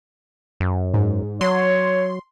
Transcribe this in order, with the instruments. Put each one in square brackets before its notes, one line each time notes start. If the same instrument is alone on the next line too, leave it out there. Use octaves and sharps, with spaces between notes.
[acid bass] F#2
[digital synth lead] G#2
[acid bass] F#3 [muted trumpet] C#5 [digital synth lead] C6